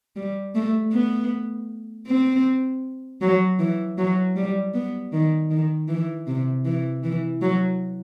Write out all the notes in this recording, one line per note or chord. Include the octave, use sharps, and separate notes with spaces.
G3
A3
B3
C4
F#3
E3
F#3
G3
B3
D#3
D#3
E3
C3
E3
E3
F#3